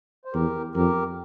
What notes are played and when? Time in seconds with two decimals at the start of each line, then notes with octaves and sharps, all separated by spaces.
0.25 C5
0.33 E2 G4 A#4
0.75 F2 G4 A#4